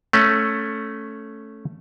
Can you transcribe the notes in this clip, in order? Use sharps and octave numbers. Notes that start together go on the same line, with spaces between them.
A3 C#4